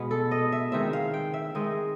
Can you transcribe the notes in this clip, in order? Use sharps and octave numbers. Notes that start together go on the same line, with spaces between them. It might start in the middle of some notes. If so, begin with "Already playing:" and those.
Already playing: B2 G#3 B3
A4
D#5
E5
D#3 G#3 C4 E5
F5
G5
E5
D#3 G#3 C4 D#5